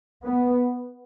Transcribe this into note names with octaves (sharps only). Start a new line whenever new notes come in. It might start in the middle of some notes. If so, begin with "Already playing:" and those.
B3